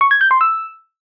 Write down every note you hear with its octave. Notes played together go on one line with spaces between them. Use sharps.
C#6
G#6
G6
C6
E6